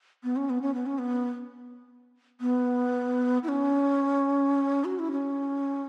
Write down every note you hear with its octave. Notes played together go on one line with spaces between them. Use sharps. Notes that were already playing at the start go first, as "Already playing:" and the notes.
B3
C#4
B3
C#4
B3
C#4
B3
B3
E4
C#4
F#4
E4
C#4